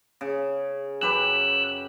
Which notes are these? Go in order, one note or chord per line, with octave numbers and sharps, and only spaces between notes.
C#3
F#2 G4 B4 E6 F#6